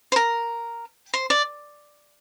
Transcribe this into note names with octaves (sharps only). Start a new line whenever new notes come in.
C5
A#4
C5
D5